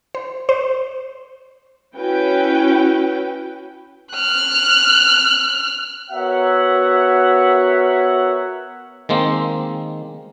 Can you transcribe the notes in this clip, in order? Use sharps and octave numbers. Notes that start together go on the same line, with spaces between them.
C5
C5
C#4 E4 F#4 B4 G5
F6 F#6
B3 F#4 A#4 C#5 E5 F#5
D#3 G#3 A#3 C4